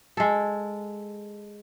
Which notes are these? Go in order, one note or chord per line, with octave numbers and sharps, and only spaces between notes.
G#3 A4